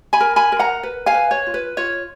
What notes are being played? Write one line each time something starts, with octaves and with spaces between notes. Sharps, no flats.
G#5 B5
A#4
G#5 B5
A#4
F#5 A#5
B4
F5 G#5
B4
C#5
F4
B4
F4 C#5